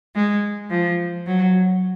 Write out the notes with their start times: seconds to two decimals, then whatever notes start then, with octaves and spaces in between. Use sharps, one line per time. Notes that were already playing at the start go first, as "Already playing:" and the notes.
0.16 G#3
0.70 F3
1.26 F#3